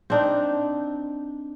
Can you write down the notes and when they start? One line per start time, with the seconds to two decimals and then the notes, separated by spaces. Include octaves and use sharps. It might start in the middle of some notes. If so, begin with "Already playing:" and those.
0.10 C4 D4 D#4